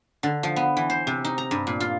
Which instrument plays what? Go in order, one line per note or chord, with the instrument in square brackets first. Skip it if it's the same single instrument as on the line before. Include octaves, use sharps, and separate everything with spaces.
[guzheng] D3
F3
B3
E3
C5
C3
D#4
A#5
G2
A#2
F4